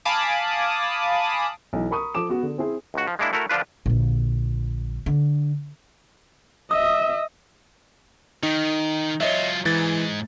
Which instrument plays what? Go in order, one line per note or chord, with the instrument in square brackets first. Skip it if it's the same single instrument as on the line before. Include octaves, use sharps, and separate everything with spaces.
[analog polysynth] F5 G#5 A5 B5 D6 D#6
[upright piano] B1 E3
A#4 B5 C#6 D#6
F3 A4 D6 E7
B3 F#4
D3
C4 E4 G#4 C5
[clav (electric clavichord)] C#2 F#4
F3
G#3 A#3 D4 E4
A3 E4 F#4 A#4
D3 F3 D4 F4 B4
[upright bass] A#1 D3
D3
[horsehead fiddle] D#5 E5 [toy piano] D#6
[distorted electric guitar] D#3 [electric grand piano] D#4
[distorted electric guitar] F#3 F4 [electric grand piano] C#5 D#5 E5
[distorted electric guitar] G#2 [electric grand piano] E3 A6